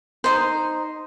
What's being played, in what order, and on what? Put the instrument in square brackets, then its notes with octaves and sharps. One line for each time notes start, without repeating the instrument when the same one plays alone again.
[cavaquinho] D#4 C5